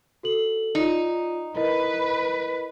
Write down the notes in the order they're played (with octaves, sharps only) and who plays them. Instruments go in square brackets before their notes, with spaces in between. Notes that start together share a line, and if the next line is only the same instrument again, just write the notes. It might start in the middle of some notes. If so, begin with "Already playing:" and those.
[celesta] F#4 A4 F#7
[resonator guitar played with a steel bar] D#4 [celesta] F4 D5
[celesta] E4 A#4 D#5 [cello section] B4